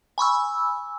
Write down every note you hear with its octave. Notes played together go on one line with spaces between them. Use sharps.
G#5 B5 C#6 E6